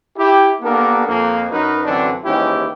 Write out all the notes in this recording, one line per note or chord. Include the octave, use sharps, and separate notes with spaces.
E4 G4
A#3 B3 D4 G4 A4 A#4
F2 A#3
F#2 F#3 D#4 A#4 B4
F#2 D3 E3 F#3 C4 D4
D#2 G#2 E3 C#4 E4 G4